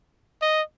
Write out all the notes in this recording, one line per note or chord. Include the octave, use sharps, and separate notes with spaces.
D#5